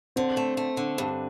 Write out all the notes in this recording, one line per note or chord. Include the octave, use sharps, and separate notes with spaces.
D3 C4
A3
A3
D3
G2